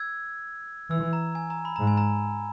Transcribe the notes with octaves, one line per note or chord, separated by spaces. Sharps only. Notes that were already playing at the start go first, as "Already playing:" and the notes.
Already playing: E6 G#6
E3 E6
A#5
G#5
A#5
B5
G#2 A#5
G#5
A#5